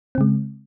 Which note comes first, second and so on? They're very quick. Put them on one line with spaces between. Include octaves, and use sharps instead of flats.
C4 C#3 G#3